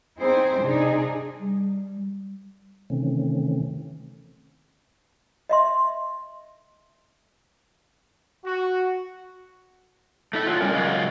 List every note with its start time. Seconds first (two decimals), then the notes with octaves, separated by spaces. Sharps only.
0.19 C4 D#4 E4 G#4 C5
0.60 C3 D4 D#4 G#4
1.40 G3
2.90 C3 D#3 E3 A3 C4 C#4
5.49 D#5 E5 C6
8.44 F#4
10.33 A3 E4 E5
10.46 F#3 F4
10.61 G3 C#4 A#4
10.73 F#2 C#3 G#3 F4